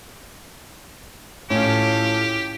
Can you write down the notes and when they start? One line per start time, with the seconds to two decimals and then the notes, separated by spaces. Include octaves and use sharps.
1.50 A2 C#4 F4 G4 A4